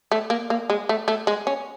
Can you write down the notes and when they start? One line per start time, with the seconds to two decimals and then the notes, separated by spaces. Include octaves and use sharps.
0.12 A3
0.30 A#3
0.50 A#3
0.70 G#3
0.89 A3
1.08 A3
1.27 G#3
1.47 C#4